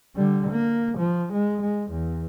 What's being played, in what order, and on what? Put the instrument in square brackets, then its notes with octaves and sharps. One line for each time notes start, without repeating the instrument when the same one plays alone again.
[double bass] D3 G3
A#3
F3
G#3
G#3
E2